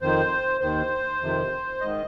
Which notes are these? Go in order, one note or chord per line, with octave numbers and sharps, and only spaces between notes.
F2 D#3 C5
D#2 D#3 C5
F2 C3 D#3
G#2 D#3 D#5